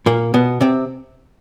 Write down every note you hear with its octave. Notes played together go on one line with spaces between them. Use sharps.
A#2 A#3
B2 B3
C3 C4